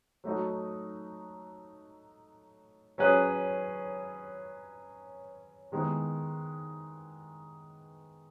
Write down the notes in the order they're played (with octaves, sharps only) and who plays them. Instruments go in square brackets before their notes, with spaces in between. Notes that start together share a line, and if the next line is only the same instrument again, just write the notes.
[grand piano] F#3 A3 D#4 F#4
F#3 C#4 G#4 B4
D#3 G#3 B3 E4